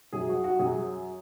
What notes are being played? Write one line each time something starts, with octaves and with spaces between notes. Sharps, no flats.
F#2 F#3 G#4
F#4
F#4
F#2 F#3 G#4